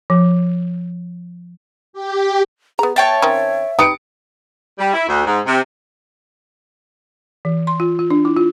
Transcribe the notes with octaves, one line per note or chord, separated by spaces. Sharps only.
F3
G4
B3 G#4 A#5
C#5 E5 G5 A5
D#3 C4 C#4
D#4 G4 B4 D#6 C#7 D7
G3
E4
D2
G#2
C3
E3
C6
F4
F4
D4
E4
F4